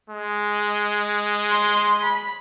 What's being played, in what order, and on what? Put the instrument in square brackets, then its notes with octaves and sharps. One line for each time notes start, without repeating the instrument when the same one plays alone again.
[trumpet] G#3
[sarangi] C6
B5